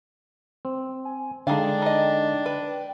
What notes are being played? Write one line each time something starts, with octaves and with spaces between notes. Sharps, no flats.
C4
G#5
D3 G#3 D4 D#4 G#4 F5 G5
D#4 D#5
B4